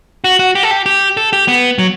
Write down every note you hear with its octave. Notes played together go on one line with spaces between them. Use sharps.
F#4
F#4
G4
A4
G4
G4
A4
G4
B3
F#3